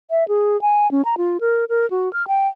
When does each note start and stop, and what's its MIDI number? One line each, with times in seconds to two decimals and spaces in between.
0.11 0.27 76
0.28 0.60 68
0.62 0.90 80
0.91 1.02 61
1.05 1.15 82
1.18 1.38 65
1.41 1.65 70
1.69 1.89 70
1.90 2.11 66
2.13 2.26 89
2.28 2.48 79